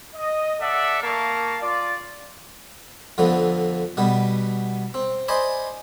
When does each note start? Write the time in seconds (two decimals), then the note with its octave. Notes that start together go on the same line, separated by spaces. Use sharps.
0.14 D#5
0.60 A4 D5 E5 F#5
1.01 A#3 A#4 F5 A5 C#6
1.62 F4 D5
3.18 F2 D3 F3 B3
3.97 B2 G3 B3
4.94 C4
5.28 C5 D5 D#5 G#5 B5